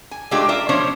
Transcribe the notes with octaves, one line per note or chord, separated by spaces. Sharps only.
G#5
G#3 A3 C#4 D4 F4 G4
F4 A#4 D5 E5
B2 F3 C#4 D4 C5 C#5